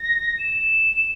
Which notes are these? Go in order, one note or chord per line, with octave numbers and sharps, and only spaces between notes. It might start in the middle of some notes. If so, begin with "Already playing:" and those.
Already playing: A#6
E7